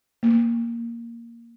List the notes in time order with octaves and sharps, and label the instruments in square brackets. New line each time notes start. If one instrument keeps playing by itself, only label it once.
[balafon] A#3